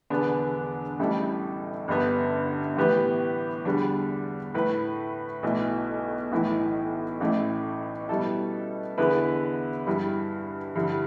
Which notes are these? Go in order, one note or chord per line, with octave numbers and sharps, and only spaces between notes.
E1 E2 D3 B3 D4
A1 A2 G3 E4 A4
G1 G2 D3 B3
A2 E3 B3 G4 B4
E2 D3 G3 D4
A2 A3 E4 B4
B1 B2 A3 E4
B1 A2 E3 A3 E4
A1 A2 A3 E4
B2 G3 E4 A4
E2 D3 B3 E4 B4
G2 G3 E4
G2 D3 G3 E4